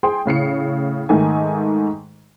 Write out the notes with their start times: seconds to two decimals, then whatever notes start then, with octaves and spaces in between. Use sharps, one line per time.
0.03 G#4 G5 C6
0.25 A2 C#3 C7 C#7
1.09 G#2 D#3 A3 D#4 G#5